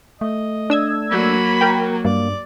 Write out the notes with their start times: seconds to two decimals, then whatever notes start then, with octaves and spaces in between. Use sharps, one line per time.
0.21 A3 D#5
0.70 D4 E6 G#6
1.11 F#3 A#3 B5
1.61 A#4 G5
2.05 G2 A#3 D5